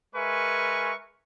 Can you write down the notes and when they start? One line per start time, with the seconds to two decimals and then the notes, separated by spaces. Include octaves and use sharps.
0.15 G#3 A#4 B4 E5 G#5 C#6